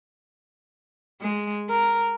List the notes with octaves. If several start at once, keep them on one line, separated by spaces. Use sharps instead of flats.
G#3
A#4